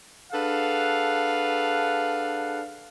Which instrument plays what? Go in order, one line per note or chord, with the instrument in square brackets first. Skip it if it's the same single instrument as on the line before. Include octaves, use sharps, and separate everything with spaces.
[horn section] D4 G#4 A4 B4 F5 F#5